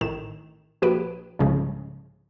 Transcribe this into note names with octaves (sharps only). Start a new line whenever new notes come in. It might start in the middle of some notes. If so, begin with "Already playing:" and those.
A1 A2 D#3 E7
A#1 F#4 G4 B4 D7
C2 G#2 C#3 F3 G#3